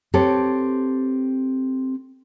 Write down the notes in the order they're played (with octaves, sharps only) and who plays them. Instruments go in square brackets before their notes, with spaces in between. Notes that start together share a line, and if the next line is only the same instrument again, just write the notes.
[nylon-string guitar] C4 G4 A4 B4 C#5